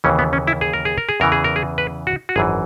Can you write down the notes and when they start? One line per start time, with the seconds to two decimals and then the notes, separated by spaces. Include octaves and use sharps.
0.04 D#2 C#3 E3 C#4
0.19 B3
0.33 C#4
0.47 E4
0.61 G#4
0.73 A#4
0.85 G#4
0.98 A#4
1.09 G#4
1.20 E2 C#3 E3 A#4
1.32 G#4
1.44 A#4
1.56 G#4
1.78 B4
2.07 F#4
2.29 F#4
2.36 G#1 F#2 E3 G#4